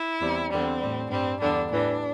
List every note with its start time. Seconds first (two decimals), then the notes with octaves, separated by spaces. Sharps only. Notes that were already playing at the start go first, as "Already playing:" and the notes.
Already playing: E4
0.21 E2 C3 G3
0.51 E2 D3 G3 C4
0.81 A2 G3
1.10 G2 G3 C4
1.40 E2 D3 G3 D4
1.70 A2 E3 G3 D4